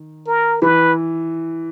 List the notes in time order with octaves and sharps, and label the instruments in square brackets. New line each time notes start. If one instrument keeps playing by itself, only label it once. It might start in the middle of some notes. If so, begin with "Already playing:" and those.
Already playing: [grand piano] D#3
[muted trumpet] A#4
[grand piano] E3 [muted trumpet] B4